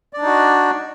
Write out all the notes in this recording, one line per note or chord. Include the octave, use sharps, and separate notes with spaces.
D4 D#4 F#4 D5